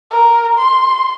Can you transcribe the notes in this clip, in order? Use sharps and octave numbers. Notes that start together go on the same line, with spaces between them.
A#4
C6